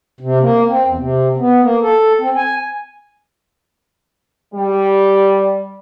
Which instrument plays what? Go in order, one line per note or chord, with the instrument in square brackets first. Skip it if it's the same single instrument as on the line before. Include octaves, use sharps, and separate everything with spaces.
[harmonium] C3
A#3
C4
E2
C3
B3
A#3
A4
C4
G#5
[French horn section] G3